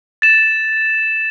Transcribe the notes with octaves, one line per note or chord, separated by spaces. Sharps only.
A6 E7